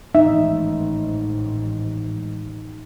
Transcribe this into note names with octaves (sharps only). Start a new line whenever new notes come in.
A1 G#2 D#4 E5